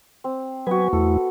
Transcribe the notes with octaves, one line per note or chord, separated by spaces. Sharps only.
C4
F#3 B3 F#4 B4 G#5
E2 A3 E4 A4